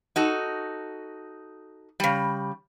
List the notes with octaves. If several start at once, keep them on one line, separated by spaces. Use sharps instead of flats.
D#4 F#4 A4
C#3 G3